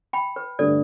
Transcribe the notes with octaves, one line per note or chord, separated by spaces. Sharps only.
G5 B5
B4
G2 D3 A3 D4 G4 A4 D5